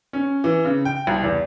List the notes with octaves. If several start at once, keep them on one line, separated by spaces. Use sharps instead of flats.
C#4
E3
C#3
G5
C2
E2